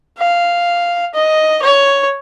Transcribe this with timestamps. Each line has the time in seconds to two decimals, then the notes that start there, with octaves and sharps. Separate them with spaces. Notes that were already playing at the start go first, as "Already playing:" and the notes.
0.18 F5
1.14 D#5
1.62 C#5